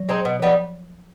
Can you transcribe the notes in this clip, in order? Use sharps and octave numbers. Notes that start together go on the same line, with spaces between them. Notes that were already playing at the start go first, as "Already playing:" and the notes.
Already playing: F#3
G#3 C4 D#4
B2
F3 G3 B3 D#4